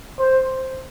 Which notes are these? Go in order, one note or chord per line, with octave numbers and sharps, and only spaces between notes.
C5